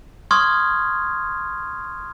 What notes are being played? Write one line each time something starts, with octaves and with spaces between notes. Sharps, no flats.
C6 C#6 D#6 F6 G#6